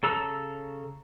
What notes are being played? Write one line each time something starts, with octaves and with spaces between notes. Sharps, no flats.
C#3 A4 A#5 E6